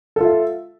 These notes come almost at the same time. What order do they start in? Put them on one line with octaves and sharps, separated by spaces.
A4 F4 E5